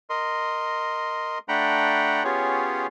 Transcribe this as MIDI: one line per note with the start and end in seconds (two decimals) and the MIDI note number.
0.10 1.38 70
0.10 1.38 75
0.10 1.38 84
1.48 2.23 57
1.48 2.23 62
1.48 2.23 78
1.48 2.23 79
1.48 2.23 82
1.48 2.23 83
2.24 2.87 59
2.24 2.87 61
2.24 2.87 65
2.24 2.87 67
2.24 2.87 68
2.24 2.87 73